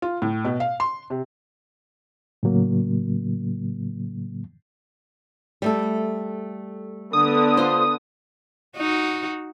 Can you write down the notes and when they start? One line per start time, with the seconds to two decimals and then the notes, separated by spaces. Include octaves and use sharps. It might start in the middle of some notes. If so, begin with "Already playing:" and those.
0.02 F4
0.22 A2
0.45 B2
0.60 F5
0.80 C6
1.10 C3
2.43 A2 C#3 F#3 A#3
5.62 G3 A3 A4
7.13 D3 B3 D#6
7.57 F4 C5
8.77 D#4 F#4